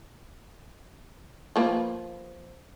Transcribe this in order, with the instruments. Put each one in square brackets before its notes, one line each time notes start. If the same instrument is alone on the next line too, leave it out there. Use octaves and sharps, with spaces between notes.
[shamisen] F3 A#3 B4